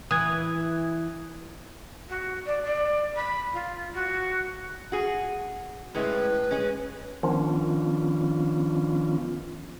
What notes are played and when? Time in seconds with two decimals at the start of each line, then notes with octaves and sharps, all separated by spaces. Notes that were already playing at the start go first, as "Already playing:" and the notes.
0.11 E3 D#6 G#6
2.09 F#4
2.46 D5
2.64 D5
3.16 B5
3.53 F4
3.94 F#4
4.92 F#4 G#4
5.95 A2 G#3 C#4 B4
6.51 G#3 C#4
7.23 D#3 F3 B3 C#4 D4 F4